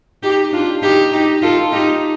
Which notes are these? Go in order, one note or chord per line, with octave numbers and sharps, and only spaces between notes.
D#4 G4
D4 F4
D#4 G4
D#4 G4
F4 A4
D#4 G4